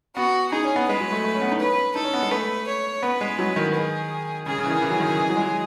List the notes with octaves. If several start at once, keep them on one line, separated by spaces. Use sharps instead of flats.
B3 F#4
D#4 G#4
C#4
B3
G#3 B4
F#3
A3
A3
C#4
B3
D#4
C#4 B4
D#4 A4
C#4
B3
G#3
A3 B4
C#5
B3 B4
G#3
F#3
D#3
G#4
C#3 G#4
C#3
E3
D#3
E3
F#3
D#3
C#3
E3
F#3
G#3
F#3